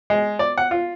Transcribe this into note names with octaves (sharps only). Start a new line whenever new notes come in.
G#3
D5
F#5
F4